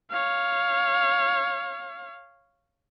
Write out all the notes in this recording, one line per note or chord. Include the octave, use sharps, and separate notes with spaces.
C#5 F5